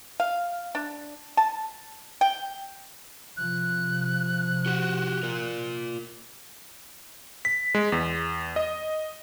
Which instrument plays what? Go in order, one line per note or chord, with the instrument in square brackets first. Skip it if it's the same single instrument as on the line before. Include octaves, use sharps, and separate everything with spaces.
[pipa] F5
D4
A5
G5
[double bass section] C3 F3 [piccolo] F#6
[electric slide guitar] F#4 G4 F#5
F4 A#4
[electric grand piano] B6
G#3
E2
D#5